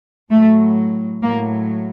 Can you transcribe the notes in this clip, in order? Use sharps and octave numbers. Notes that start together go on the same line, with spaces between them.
A2 F#3 A3
A2 F#3 A#3